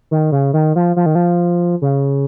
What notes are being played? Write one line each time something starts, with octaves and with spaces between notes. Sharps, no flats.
D#3
C#3
D#3
F3
F3
D#3
F3
C#3